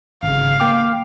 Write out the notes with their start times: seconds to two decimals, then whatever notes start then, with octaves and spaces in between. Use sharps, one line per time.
0.23 G#1 C#3 F5
0.60 A#3 G5 D6